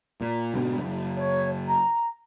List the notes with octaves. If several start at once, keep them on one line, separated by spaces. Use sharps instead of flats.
A#2
G#2 B2 D3
F#1
C#5
A#5